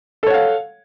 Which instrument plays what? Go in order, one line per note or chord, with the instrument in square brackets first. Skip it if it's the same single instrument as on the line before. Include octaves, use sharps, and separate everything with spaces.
[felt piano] A4
C#5
F#5
F5